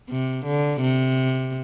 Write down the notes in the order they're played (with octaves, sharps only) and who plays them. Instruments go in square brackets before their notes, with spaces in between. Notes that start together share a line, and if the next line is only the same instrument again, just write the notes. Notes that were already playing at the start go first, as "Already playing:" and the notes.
[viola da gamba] C3
D3
C3